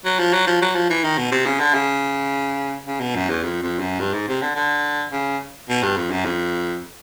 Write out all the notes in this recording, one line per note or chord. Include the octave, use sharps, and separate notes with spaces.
F#3
F3
F#3
F3
F#3
F3
E3
D#3
B2
C3
C#3
D3
C#3
C#3
B2
F#2
E2
F2
F2
F#2
G2
G#2
C3
D3
D3
C#3
B2
G2
F2
F#2
F2